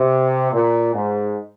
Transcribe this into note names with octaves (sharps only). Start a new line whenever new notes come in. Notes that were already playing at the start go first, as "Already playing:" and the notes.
Already playing: C3
A#2
G#2